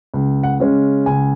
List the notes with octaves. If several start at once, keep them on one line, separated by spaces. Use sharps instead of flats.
C#2
F#5
C#3 G#3 C#4
C#2 G#5